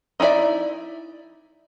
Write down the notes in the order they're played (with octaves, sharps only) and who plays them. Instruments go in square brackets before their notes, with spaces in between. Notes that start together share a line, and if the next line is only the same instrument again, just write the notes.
[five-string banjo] D#4 E4 A#4 D5 E5